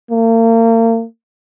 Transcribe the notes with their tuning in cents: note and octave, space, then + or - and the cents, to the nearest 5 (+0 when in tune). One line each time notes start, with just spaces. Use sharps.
A#3 -40